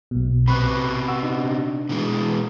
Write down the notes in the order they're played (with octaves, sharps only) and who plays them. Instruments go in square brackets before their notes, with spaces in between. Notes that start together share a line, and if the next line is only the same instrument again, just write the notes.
[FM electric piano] B1 B2
[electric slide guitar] C3 B3 [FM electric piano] B5 C#6 F#6
[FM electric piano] F#5 E6
D4 D#4
[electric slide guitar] B2 E3 G#3